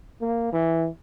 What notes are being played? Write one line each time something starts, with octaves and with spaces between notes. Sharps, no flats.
A#3
E3